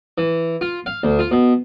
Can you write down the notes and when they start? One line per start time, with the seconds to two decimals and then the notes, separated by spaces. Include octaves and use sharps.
0.18 E3
0.61 F4
0.86 F5
1.03 D2
1.19 F4
1.31 B2